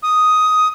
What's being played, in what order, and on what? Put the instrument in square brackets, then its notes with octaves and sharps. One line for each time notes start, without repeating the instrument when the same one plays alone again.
[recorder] D#6